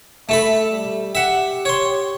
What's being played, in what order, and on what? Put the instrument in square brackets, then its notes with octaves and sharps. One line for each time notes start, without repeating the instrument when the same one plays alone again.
[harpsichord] A3 A4 B5 [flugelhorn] E5
[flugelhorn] G3
[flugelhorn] G4 [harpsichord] E5 F#5
[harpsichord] C#5 C6